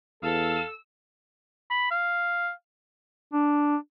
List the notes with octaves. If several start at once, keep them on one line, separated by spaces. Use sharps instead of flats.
E2 A4 F5 E6
B5
F5
D4